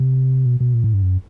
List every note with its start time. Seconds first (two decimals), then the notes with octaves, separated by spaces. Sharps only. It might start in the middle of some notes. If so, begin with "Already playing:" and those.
Already playing: C3
0.46 B2
0.60 B2
0.74 A#2
0.84 A2
0.94 G2
1.03 F#2